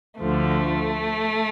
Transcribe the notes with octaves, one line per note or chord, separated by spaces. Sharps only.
D2 D3 F3 A3